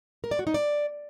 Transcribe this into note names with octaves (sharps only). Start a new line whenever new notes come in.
A#4
D5
F#4
D#4
D5